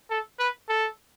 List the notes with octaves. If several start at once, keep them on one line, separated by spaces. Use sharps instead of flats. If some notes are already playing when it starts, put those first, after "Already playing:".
A4
B4
A4